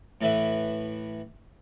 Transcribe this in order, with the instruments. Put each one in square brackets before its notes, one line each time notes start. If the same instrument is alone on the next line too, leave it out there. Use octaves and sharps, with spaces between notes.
[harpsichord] A2 E3 B4 E5